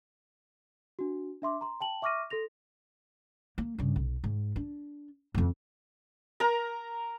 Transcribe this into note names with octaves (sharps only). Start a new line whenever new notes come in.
D4 F#4
D4 E5 C6 D6
A#5 C6
G5 A5 F#7
E5 C#6 D6 F6 A#6 D#7
A4 C6 A#6 F7
A#3
G2 C#3
B1
G#2
D4
E1 F2
A#4 A#5